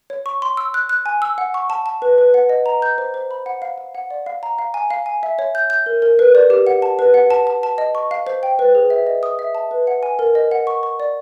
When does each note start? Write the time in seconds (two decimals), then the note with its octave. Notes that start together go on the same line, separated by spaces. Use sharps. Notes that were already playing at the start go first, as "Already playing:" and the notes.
0.10 C#5
0.26 C#6
0.42 C6
0.57 E6
0.74 F#6
0.89 F#6
1.06 G#5
1.22 E6
1.38 F#5
1.54 C#6
1.70 A5
1.86 A5
2.02 B4
2.18 B4
2.34 F#5
2.49 D#5
2.66 A#5
2.82 G6
2.98 C5
3.14 C5
3.31 B5
3.46 F#5
3.62 F5
3.78 F5
3.95 F#5
4.11 D5
4.26 F5
4.43 A#5
4.59 F5
4.74 G#5
4.91 F5
5.06 G#5
5.23 E5
5.39 C#5
5.55 G6
5.70 G6
5.86 A#4
6.02 A#4
6.19 B4
6.35 D5
6.50 G4
6.67 F#5
6.82 A5
6.99 B4
7.14 F#5
7.30 A5
7.47 A5
7.63 A5
7.78 D#5
7.95 C#6
8.11 F5
8.27 C5
8.43 G5
8.59 B4
8.75 G#4
8.90 E5
9.07 D#5
9.23 D#6
9.39 E5
9.55 A5
9.71 B4
9.87 F#5
10.03 G#5
10.19 A#4
10.35 D#5
10.51 F#5
10.67 C#6
10.83 C#6
11.00 D5